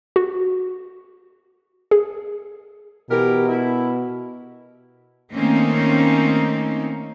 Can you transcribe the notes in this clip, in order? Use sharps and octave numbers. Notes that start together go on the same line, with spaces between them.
F#4
G#4
B2 E3 G4 A#4
E4
D#3 A3 A#3 C4 C#4 D#4